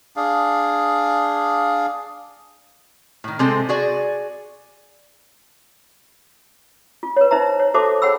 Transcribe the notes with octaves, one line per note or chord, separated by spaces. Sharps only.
D4 G#4 F5
A2 D#3
C3 G#3 C4 A4
F#4 G#4 D5
F4
B4 C#5
D#4 C5 E5 A#5
C#5
F#4 A4 C5 E5 A5 D6
G#4 C#5 F#5 G5 B5 E6